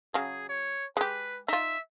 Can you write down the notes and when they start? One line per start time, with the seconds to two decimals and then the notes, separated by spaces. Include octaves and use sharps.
0.14 C#3 F#3 G#4
0.49 C#5
0.97 G#3 G4 B4
1.48 D#4 F4 E5